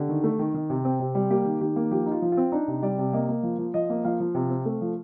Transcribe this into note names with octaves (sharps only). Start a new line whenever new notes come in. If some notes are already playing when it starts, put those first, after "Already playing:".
Already playing: D3 G4
D#3
A3
D#3
D#3
C3
C4
C3
G3
A#3 G4
D#3
D#3 G4
A#3
F3 G4
D#4
F4
F3
F4
C4
D4 D#4
C3
G3 D5
C3
A#3 D#5
A#3
F3
F3
F3 D#5
A#3
F3 F5
F3
C3
C4
A3
F3